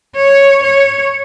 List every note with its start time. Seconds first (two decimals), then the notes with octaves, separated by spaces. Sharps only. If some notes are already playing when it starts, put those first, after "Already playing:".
0.16 C#5
0.63 C#5